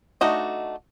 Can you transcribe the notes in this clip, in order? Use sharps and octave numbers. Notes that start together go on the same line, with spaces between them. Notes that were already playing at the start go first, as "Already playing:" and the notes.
A3 D4 D#4 F#4 D#5